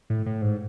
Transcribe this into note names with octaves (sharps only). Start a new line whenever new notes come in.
A2
A2
G#2